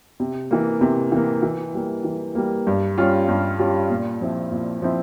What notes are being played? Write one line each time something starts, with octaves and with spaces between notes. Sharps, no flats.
C3
E3 A#3
C3
E3 A#3
E3
G3 A#3
E3
G3 A#3
G2
G3 C#4 F4
G2
G3 C#4 F4
A#2
F3 C4 E4
A#2
F3 C4 E4